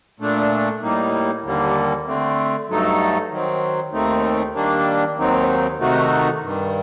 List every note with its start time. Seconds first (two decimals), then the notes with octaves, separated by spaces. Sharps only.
0.20 A#2 A3 D4
0.81 A2 G3 A#3 D#4
1.44 D#2 D3 G3 A#3
2.07 D3 A3 C4
2.69 G2 F#3 A3 D#4 A4
3.31 D#3 F#3 C4
3.93 D#2 D#3 A3 C4 D#4
4.55 D#3 G3 A#3 D4
5.17 D#2 D#3 F#3 C4 D#4
5.79 C3 D#3 A3 D#4 F#4
6.42 G2 D#3 G3